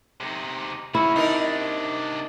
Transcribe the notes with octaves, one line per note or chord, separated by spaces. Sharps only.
C3 D#4
C#4 E4 F#4
C3 D4 D#4 A#4